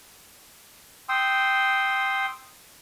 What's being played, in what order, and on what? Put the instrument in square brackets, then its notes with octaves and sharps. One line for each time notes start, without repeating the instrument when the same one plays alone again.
[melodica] G5 C6 D#6 E6